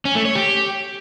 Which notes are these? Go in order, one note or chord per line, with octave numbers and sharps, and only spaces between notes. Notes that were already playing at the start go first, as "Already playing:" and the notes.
C#4
A3
C#5
G4